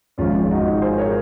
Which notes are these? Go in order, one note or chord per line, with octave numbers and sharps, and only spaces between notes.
G#1 G#2 F3 C#4 F4
D#4 F#4
G#4 C5
A#4 C#5